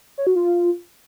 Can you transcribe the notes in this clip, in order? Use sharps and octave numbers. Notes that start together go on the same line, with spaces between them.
C#5
F#4
F4